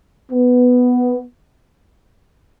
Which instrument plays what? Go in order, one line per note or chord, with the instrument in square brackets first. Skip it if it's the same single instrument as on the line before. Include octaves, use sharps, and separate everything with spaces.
[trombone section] B3